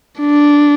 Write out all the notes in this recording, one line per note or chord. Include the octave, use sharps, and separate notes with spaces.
D4